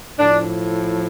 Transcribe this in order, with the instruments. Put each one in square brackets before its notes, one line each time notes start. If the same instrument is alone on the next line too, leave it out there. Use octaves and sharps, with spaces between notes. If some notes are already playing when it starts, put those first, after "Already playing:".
[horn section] A2 F3 D4